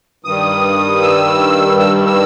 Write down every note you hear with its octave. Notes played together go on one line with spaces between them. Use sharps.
G2 D#3 G3 D#6
E6
E6
E6